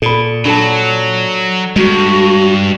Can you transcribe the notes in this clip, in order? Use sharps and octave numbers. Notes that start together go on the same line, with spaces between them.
A#2 A4 B5
F#3 D4 A4 A5
G2 G#3 F#4